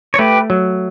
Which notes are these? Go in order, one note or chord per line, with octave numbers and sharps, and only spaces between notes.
C#5
A3 G4 B4
F#3